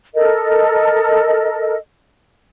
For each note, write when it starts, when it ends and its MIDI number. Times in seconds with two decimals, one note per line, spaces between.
0.15 1.77 69
0.15 1.77 70
0.15 1.77 75